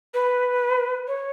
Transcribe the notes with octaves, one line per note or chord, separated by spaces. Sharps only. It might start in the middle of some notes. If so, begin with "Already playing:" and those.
B4
C#5